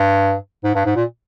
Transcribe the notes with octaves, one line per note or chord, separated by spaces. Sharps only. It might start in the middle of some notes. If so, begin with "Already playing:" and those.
Already playing: G2
G#2
G2
G#2
A#2